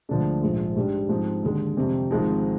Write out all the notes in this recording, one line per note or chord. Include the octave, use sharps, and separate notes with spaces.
D2 D3 F3 G#3 D4
A#1 G#2 F3
G#2 G3 D4
G#2 F3 C4 D#4
D#2 D3 G#3
F2 C3 G3 C4
G#1 G#2 F3 G#3 D#4